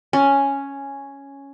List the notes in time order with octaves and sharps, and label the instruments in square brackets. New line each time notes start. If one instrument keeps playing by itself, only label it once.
[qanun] C#4